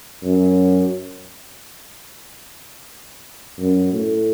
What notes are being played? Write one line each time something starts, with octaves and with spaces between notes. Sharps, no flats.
F#2
F#2
A2